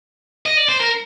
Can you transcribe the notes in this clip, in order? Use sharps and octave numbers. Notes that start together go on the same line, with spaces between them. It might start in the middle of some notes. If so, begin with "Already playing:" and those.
D#5
D5
C5
A#4